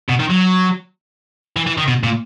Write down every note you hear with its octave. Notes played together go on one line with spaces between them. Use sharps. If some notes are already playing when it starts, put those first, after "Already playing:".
B2
D#3
F#3
E3
E3
D#3
B2
A#2